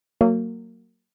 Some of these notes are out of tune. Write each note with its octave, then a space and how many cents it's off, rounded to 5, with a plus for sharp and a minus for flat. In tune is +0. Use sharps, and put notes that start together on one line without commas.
F#3 +0 A#3 -25